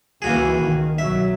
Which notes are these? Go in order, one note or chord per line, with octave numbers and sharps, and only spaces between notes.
C#2 E3 A#3 F#4 G#4
C#2 D#3
B1 F#3 E5